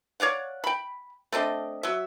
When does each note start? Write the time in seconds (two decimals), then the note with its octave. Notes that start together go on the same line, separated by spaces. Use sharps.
0.20 C#5 D5 F5 F#5
0.64 G5 B5
1.32 A3 C4 D4 D#5
1.83 F#3 E5